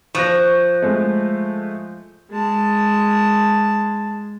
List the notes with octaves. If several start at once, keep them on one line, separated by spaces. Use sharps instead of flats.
F3 C#6 F#6 A#6
G#3 A3
G#3 A5